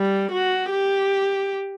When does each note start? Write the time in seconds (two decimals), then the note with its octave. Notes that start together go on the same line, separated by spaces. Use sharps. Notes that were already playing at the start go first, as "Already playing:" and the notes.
Already playing: G3
0.32 F#4
0.71 G4